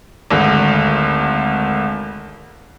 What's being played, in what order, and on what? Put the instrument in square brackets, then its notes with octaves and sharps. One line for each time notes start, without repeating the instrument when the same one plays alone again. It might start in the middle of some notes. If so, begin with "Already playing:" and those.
[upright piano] G#1 D2